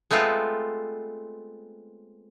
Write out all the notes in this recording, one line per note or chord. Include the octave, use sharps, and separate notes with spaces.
G#3 A3 B3 C4 F4